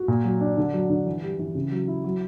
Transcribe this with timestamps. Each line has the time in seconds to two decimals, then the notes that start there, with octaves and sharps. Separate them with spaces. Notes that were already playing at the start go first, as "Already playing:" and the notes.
Already playing: F#4
0.08 A#2
0.24 F#3
0.41 D4
0.57 D3
0.74 F#3
0.90 D3
1.06 E3
1.23 G3
1.39 E3
1.55 C#3
1.71 F#3
1.88 E4
2.04 F#3